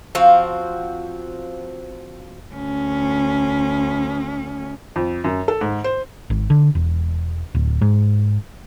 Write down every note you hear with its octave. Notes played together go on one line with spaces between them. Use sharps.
F3 C4 F#4 F5
D2 C#4
F2
F#2
A4
G#2
C5
G#1
D3
E1
D1
G#2